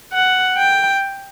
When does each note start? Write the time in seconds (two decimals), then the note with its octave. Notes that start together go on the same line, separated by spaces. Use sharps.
0.13 F#5
0.58 G5